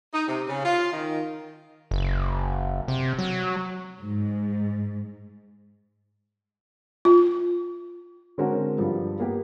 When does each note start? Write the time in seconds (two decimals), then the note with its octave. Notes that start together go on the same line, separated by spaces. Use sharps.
0.14 D#4
0.27 C3
0.48 C#3
0.64 F4
0.92 D#3
1.91 F#1
2.88 C3
3.19 F#3
4.03 G#2
7.05 F4
8.38 D3 G#3 C4 C#4 F#4 A#4
8.78 G2 F3 G3
9.20 A#3 B3 G4